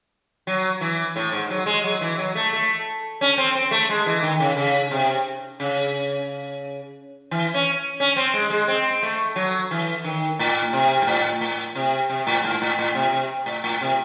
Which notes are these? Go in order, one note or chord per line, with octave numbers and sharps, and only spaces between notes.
F#3
E3
A2
G#2
F#3
G#3
F#3
E3
F#3
A3
A3
C#4
C4
C4
A3
G#3
E3
D#3
C#3
C#3
C3
C#3
E3
C#4
C#4
C4
G#3
G#3
C4
A3
F#3
E3
D#3
A2
C3
G#2
A2
A2
C3
C3
A2
G#2
A2
A2
C3
C3
A2
A2
C3